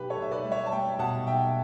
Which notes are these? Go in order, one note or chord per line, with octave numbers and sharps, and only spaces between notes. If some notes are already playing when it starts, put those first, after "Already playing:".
Already playing: B1 G4 B4
A4 C#5
B1 E5
B4 D5
G3
C#5 E5
A5
G3 E5 G5
B2 F#5 A5
B1 E5 G5